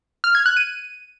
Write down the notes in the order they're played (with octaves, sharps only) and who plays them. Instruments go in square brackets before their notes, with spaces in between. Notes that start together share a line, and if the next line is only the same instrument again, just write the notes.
[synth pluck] F6
G#6
F#6
D#7